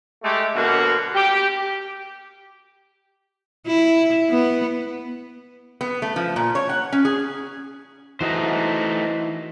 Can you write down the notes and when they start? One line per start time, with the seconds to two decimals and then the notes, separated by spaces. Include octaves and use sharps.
0.24 G#3 A3 G4
0.55 B2 D3 F#3 A#3 F#4
1.14 G4
3.67 E4
4.30 B3 B4
5.81 B3
6.02 A3
6.16 F3
6.36 A#2
6.55 C#5
6.69 F#5
6.92 C#4
7.05 G#4
8.21 E3 A3 D#4 F#4 C5 D#5